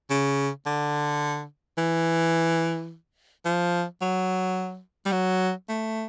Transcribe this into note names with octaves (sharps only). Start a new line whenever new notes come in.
C#3
D3
E3
F3
F#3
G3
F#3
A3